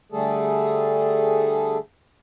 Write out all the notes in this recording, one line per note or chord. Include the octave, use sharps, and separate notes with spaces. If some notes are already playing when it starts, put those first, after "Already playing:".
D3 G3 A3 G#4 A4